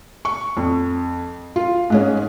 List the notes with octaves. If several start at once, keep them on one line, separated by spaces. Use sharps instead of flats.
C#6
F2
F4
G#2 G#3 C#4